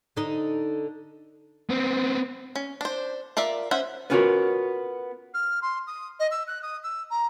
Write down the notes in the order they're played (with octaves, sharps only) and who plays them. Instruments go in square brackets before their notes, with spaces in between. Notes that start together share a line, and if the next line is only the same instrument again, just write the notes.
[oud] D3 D#4
[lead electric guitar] B3 C4
[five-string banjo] C#4
D4 C5
F4 A#4 D5 E5
C#4 C5 E5 F#5
[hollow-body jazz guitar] B3 C#4 F4 F#4 A#4 C#5
[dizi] F6
C6
D#6
D#5
E6
F#6
D#6
E6
A#5